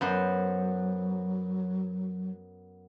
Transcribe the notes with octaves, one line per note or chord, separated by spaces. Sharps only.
F#2 F#3 B3 C5